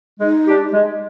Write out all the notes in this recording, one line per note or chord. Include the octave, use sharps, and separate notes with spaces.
G#3 D#4
D4 G4
G#3